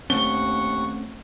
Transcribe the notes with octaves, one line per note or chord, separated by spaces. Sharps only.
D#2 A3 C4 C#4 F#5 C#6 G7